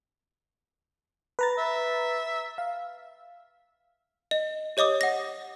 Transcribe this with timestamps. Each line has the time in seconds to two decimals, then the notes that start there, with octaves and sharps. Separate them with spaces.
1.39 B4 A#5 A6
1.58 E5
2.58 F5
4.31 D#5
4.77 G4 C#5 D#5 D6 D#6
5.01 F#5 A#6